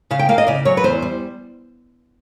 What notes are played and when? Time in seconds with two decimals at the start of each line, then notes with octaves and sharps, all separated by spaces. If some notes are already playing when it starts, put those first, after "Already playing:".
0.11 C#3 F5
0.19 G5
0.29 A#3 F5
0.38 D#5
0.47 C#3 D5
0.65 F#3 C#5
0.77 B4
0.84 E2 C5
1.02 G3